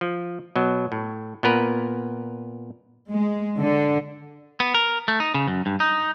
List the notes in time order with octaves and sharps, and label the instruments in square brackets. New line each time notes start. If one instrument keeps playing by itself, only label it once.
[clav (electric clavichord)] F3
B2 F#3
A2
A#2 B3 A#4 B4
[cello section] G#3
D3
[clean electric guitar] B3
A#4
A3
D#4
C#3
F#2
G2
D#4